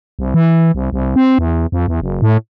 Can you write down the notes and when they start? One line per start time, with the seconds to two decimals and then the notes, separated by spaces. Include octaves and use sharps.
0.19 C2
0.34 E3
0.75 C2
0.93 C2
1.16 C4
1.39 E2
1.72 F2
1.88 E2
2.01 F#1
2.22 A2